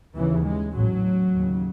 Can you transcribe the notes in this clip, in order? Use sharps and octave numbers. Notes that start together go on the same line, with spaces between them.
D#2 C#3 E3
G#3
A1 A2 F#3
D#2 C#3